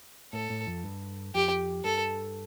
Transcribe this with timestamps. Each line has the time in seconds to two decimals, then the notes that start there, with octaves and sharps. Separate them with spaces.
0.33 A2 A4
0.50 A2
0.67 F2
0.84 G2
1.35 F2 G4
1.84 G2 A4